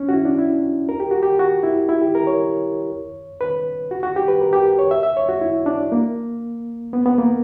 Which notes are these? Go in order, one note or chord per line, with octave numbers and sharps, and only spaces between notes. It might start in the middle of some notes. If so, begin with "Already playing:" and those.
Already playing: C#4
F#4
E4
D4
E4
A#4
G4
F#4
G4
F#4
E4
E4
G4
A#4
C#5
B4
F#4
F#4
G4
B4
A#4
G4
C#5
E5
E5
C#5
F#4
E4
D4
A#3
B3
B3
A#3